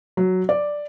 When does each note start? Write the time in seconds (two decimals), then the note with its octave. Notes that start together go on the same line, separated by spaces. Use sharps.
0.17 F#3
0.49 D5